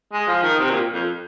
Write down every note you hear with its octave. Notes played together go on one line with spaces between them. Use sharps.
G#3
F3
D#3
C3
A#2
F2